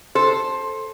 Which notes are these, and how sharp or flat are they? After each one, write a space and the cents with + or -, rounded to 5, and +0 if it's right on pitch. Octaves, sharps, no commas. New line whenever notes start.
A4 +0 C5 +15